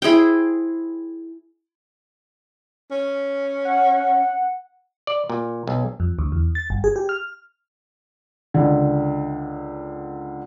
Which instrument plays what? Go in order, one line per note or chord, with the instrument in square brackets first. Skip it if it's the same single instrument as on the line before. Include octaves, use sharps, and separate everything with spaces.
[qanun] E4 G#4 C5 G5
[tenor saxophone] C#4
[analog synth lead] F#5
[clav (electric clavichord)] D5
A#2
B1
[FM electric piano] F2
D2
E2
A6
G1
G#4
G4
F6
[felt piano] C#2 D3